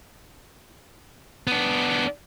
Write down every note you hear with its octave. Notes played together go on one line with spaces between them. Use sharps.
B3 D4